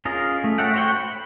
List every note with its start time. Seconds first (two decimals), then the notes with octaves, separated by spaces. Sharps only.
0.05 C#4 F4 G#4 A#4 D#5
0.44 A3
0.58 A4 C#5 E5 F#5 G5
0.74 F#4 C5 C#5 F#5 G5
0.98 B5